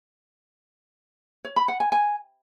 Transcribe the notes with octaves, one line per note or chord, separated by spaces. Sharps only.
C#5
B5
F#5
G#5
G#5